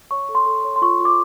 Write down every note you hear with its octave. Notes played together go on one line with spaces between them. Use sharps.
C#5 C#6
A4
C6
A4
C#5
C6
F4 C#6
F4
D6